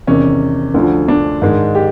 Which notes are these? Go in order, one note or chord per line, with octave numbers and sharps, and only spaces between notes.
E2 C3 D#3 C#4
D2 D3 F3
D4
G#2 D#3 G#3
G4